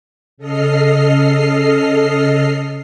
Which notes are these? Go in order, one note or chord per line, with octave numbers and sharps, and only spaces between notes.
C#3 A4 D#5 F6 C7